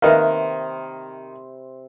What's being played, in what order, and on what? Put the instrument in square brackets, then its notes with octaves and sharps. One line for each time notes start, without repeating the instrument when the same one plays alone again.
[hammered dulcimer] C3 C5 B5 [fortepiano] D#3 A#3 [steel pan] B4 D#5 F5